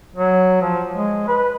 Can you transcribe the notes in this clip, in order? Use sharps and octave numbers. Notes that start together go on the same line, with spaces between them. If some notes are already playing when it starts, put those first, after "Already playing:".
F#3
F3
G#3
B4